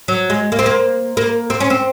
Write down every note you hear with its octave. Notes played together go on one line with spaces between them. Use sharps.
F#3
G#3
A#3
C4
A#3
A#3
C4
C#4
C4